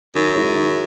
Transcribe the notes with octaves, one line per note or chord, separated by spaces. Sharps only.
F#2 D#3
G#3 C#4 E4
D#3